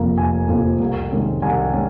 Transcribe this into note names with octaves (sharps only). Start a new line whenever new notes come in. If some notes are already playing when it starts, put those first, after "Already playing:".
Already playing: F1 F2 C3 F3 A#3 A#5
F1 G#5
F2 C3 F3 A#3
C2
C3 D#3 G#3 C#4
C2 G#5
G#3 C#4